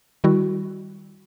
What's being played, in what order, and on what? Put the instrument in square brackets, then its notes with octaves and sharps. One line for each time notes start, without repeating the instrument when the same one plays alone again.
[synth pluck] D#3 G3 E4 F#4